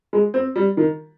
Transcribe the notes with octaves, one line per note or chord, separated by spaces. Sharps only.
G#3
C4
G3
D#3